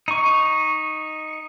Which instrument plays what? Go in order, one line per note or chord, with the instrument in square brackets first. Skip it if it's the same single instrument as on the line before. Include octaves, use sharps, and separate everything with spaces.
[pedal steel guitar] D#4 C#6